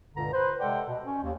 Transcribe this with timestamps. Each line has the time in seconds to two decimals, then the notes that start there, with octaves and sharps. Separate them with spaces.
0.15 C#2 G2 A#2 D3 A#5
0.33 B4 C5
0.60 C3 G#3 A4 D5 F#5 G5
0.88 B2
1.05 C#4
1.23 D#2